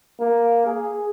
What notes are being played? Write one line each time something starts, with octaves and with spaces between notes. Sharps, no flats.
A#3
G#4